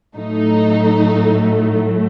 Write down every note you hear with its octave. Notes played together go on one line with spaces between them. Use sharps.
A2 F#3 A3 D#4